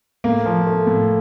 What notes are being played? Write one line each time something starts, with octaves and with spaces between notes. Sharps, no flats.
A2 A#3
F3
A3
A2